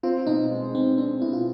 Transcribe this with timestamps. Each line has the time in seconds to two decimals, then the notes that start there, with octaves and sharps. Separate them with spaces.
0.03 C4 F4
0.27 B2 D#4
0.51 G#3
0.74 B2 C4
0.98 C4 D4
1.22 B2 E4
1.33 F4